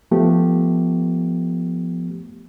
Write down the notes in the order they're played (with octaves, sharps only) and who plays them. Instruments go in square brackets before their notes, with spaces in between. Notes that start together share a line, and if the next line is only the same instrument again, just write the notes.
[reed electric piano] F3 A3 B3 G4